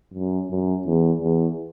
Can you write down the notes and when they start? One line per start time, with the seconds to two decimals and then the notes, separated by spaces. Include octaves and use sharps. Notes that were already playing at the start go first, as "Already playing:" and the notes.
0.14 F#2
0.50 F#2
0.87 E2
1.22 E2